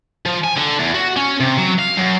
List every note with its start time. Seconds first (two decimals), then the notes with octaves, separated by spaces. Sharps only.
0.26 F3
0.44 G#5
0.57 D3
0.79 E2
0.95 F#4
1.17 C#4
1.40 C3
1.58 F#3
1.79 F5
1.97 F#2